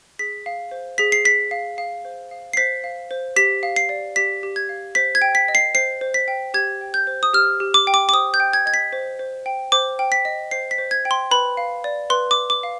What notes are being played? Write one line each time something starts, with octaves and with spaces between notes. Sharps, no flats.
G#4 B6
F5
C5
G#4 B6
C7
G#4 B6
F5
F5
C5
F5
C7
C5 B6
F5
C5
G4 B6
F5
C7
D5
G4 B6
G4
G#6
F5
C5 B6
G#6
G5
B6
D#5
C7
C5 C7
C5
B6
G5
G4 G#6
G5
G6
C5
D#6
G4 F6
G4
D6
G5
D6
D6
C5 D#6
G6
G5
G#6
D#5 G#6
B6
C5
C5
G5
C5 D6
G5
B6
D#5
C5 C7
B6
C5
G#6
G5
C6
B4 B5
F5
D5
B4 C6
D6
B4
D6
F5